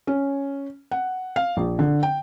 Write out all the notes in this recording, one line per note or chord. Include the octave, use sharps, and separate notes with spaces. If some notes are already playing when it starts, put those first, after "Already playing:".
C#4
F#5
F5
A#1
D3
G5